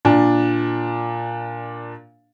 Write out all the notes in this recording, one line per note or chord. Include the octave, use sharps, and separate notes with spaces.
A#2 D4